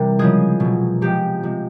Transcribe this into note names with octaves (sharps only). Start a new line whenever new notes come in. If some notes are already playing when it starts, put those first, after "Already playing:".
Already playing: C3 E3 G3 A#4
C#3 F3 G#3 G#4
B2 F#3
C3 F3 G#3 G4
C3 F3 G#3